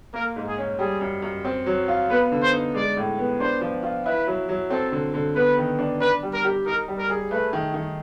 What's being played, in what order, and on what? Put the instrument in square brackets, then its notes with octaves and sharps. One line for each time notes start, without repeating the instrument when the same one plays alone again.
[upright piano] A#3 [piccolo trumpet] A#4
[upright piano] G#2
[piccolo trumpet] G#4
[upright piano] C#4
[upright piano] G3 [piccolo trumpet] G#4
[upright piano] F#2
F#2
C4
F#3
F4
[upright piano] B3 [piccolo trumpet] B4
[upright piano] D3
[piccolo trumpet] C5
[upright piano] D#4
[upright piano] G#3 [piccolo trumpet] D5
[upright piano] A2
B3
[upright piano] D4 [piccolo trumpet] C5
[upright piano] F3
F4
[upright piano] E4 [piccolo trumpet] B4
[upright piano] F#3
F#3
[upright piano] C4 [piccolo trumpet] A4
[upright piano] D3
D3
[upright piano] B3 [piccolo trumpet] B4
[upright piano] D#3
D4
[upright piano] D4 [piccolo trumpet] B4
[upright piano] G3
[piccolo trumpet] A#4
[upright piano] G4
[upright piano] D#4 [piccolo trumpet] A#4
[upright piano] G3
[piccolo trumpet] A#4
[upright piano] G#4
[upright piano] A3 [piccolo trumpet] B4
[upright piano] D#3
D#3